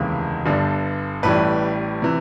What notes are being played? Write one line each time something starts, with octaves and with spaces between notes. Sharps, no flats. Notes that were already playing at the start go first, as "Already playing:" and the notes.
Already playing: F1 D#2 C#3 E3 G#3
G1 G2 D3
A1 A2 E3 G3 B4
C3 E3